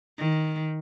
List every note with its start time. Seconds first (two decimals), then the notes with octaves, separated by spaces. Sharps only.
0.18 D#3